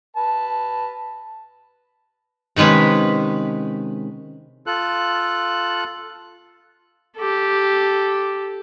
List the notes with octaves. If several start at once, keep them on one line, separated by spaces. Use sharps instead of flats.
B4 A5
C3 D#3 G#3 C#4 B4
F4 A4 F#6
G4 A4